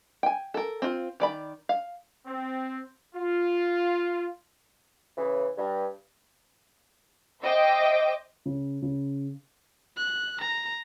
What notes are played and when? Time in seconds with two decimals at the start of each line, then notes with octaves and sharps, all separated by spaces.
0.23 G5 G#5
0.54 A4 A#4
0.82 C4 F4
1.20 D#3 D5 B5
1.69 F5
2.26 C4
3.15 F4
5.18 C#3 E3
5.58 G2
7.42 C5 D#5 E5 G5 D6
8.46 C#3
8.82 C#3
9.97 F#6
10.41 A#5